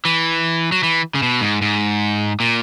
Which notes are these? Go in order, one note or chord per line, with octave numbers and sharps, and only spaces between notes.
E3
F#3
E3
C#3
B2
G#2
G#2
A#2